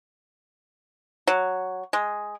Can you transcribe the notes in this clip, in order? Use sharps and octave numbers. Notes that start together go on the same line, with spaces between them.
F#3
G#3